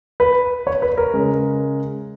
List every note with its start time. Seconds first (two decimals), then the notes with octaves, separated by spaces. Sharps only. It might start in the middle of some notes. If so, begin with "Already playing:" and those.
0.20 B4
0.67 C#5
0.82 B4
0.98 A#4
1.14 C#3 G#3